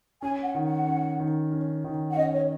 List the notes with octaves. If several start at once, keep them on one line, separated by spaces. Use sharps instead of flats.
C#4 G#5
F#5
D#3
F#5
C#4
D#3
C#4
D#3
F#5
C#4 D#5
C#5